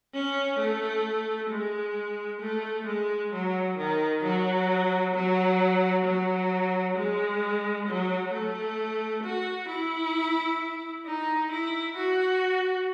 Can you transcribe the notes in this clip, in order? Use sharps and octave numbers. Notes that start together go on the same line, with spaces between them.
C#4
A3
G#3
A3
G#3
F#3
D#3
F#3
F#3
F#3
G#3
F#3
A3
F#4
E4
D#4
E4
F#4